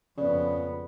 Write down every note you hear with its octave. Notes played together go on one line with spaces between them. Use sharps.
F2 C#3 B3 D5